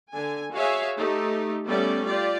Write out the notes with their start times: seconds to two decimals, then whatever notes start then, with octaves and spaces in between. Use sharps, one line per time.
0.12 D3 G#5
0.53 F#4 G#4 C#5 E5 F5 G#5
0.96 A3 D#4 G4
1.66 G3 A3 B3 C#4 D5
2.05 F4 G4 D5